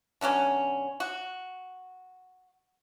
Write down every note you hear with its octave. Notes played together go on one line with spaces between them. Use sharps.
B2 D3 F#3 C#4
F#4